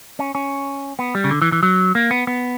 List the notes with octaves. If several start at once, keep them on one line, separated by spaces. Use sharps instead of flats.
C#4
C#4
B3
G3
C#3
D3
E3
E3
F#3
A#3
B3
B3